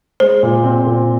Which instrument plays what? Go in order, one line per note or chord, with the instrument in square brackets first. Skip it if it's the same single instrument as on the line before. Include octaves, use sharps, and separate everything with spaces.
[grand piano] G#3 [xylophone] C5
[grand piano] A#2
C4
A#2